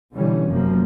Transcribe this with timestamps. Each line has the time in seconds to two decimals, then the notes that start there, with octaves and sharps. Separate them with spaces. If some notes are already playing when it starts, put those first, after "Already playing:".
0.13 B2 D3 E3 G3 C#4
0.48 F1 F#2 F3 A#3